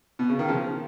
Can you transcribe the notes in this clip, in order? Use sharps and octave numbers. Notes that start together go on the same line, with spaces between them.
B2
C#3
D#3
C#3 F3